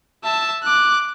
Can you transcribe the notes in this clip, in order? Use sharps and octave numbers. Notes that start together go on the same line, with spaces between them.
E5 A5
D6 F#6